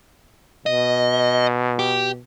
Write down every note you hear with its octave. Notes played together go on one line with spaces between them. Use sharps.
B2 D#5
G4